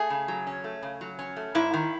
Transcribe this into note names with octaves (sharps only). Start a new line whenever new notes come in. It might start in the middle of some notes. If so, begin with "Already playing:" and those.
Already playing: A3 G#4
C#3
F#3
C#4
A3
C#3
F#3
C#4
A3
G#2 E4
D#3